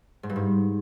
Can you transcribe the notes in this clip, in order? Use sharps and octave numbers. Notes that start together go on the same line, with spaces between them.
G#2
G2
G#2